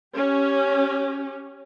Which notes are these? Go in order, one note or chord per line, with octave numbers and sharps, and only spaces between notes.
C#4 G4